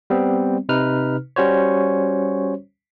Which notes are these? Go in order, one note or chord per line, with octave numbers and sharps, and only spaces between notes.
G3 B3 C4
C3 D#4 B4 F6
G3 C#4 F#4 C5 C#5